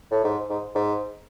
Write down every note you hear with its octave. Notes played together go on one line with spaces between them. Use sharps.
A2
G#2
G#2
G#2